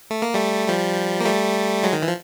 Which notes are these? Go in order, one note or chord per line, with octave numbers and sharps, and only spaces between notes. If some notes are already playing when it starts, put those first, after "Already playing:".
A3
A#3
G3 A3
F3 G3
A#3
G3 A3
F#3 G#3
D#3
E3
F3